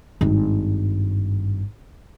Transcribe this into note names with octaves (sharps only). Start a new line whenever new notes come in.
G#1 G2